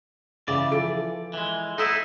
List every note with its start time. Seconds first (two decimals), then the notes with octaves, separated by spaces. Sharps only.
0.48 C#3 E3 D5
0.71 F3 A4 D7
1.33 E3 G#3
1.78 D#4 E4 A4 D#6 E6